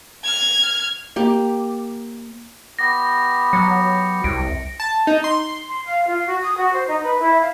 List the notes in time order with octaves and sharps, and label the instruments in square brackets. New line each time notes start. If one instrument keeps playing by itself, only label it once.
[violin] F6 G#6
[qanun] A#3 G4
[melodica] B3 G4 [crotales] A#6
[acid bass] F#3 [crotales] C#7
[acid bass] C2 [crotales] D7
[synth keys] A5
D#4
C6
[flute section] C6
F5
F4
F#4
D#6
F#4
C5
D#4
B4
E4
F5